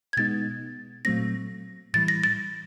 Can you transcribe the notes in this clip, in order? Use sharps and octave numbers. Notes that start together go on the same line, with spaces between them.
G#6
B2 G#3 B3 D#4 A6
A#2 F#3 A3 C4 A#6
A2 E3 G3 A6
A#6
A6